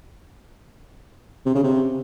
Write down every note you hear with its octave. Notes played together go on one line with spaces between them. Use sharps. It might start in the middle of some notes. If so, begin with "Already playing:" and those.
C3
C#3
C3